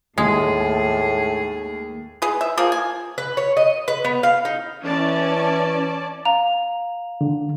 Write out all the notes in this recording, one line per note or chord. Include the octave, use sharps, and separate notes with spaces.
D#2 A2 G#3 A3 G#4
G#4 B4
E5
F3 A#3 G#4
G#5
B4
C#5
D#5
B4
B3
F5
D#4
E3 C#4 D5 A5
F5 A#5 F7
D3